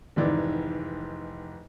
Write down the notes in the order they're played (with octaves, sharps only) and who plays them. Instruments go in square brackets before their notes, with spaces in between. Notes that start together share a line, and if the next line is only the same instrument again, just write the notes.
[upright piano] F1 G#2 D#3 E3 D5